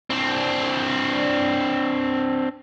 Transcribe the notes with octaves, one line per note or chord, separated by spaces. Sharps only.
C4 D4